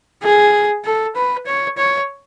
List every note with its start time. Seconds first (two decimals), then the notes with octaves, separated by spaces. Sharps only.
0.23 G#4
0.85 A4
1.15 B4
1.46 C#5
1.77 C#5